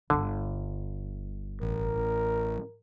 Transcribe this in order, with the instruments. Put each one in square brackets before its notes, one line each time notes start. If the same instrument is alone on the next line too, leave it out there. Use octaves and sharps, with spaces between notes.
[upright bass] G1 G2 [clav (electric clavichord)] D3
[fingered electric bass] A1 [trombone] A#4